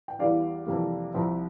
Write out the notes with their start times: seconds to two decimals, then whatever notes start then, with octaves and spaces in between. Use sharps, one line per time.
0.08 G5
0.19 E2 E3 G3 D4 D5 F5
0.67 F2 C3 E3 G3 A#3
1.14 C2 C3 F3 C4 E4